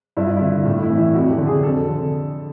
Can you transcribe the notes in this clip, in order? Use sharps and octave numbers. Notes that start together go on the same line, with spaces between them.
G2 E4
F4
D3 E4
A2
E4
E3
E4
F2 F#4
G4
D3
G#4
F2 A4
D3